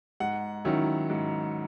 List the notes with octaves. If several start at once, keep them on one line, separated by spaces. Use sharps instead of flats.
G#2 F#5
D#3 F#3 C#4 E4
G#2